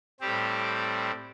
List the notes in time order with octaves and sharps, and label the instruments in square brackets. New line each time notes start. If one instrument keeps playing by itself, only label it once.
[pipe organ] A2 G3 C4 G4